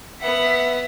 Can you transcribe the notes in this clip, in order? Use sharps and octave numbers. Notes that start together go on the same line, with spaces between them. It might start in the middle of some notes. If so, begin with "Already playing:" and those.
B3 E5 F#5